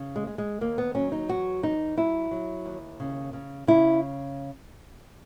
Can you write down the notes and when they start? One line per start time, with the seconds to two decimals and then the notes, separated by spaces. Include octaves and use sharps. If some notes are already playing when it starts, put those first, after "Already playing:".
Already playing: C#3
0.16 G#3
0.27 G#3
0.38 G#3
0.61 D#2 A#3
0.78 B3
0.95 F#3 C#4
1.12 D#4
1.28 E2 F#4
1.63 E2 D#4
1.97 F#3 E4
2.31 F#3
2.65 D#2
3.00 C#3
3.33 C#3
3.67 C#3 E4